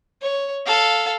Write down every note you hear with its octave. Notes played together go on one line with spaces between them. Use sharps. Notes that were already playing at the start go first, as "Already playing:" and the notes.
C#5
A4 F5